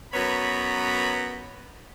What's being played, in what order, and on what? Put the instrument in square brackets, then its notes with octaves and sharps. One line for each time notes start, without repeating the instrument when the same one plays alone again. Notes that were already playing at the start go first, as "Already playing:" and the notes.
[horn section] F#2 B3 B4 C#5 A#5 B5